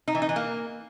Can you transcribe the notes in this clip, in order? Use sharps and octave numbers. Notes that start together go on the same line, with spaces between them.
D#4
E3
D#4
E3
A#3